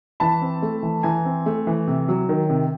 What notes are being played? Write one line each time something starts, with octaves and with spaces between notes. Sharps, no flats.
E3 A5 B5
C4
A3
E3
E3 G#5 A#5
C4
A3
E3
C3
F#3
D#3
C3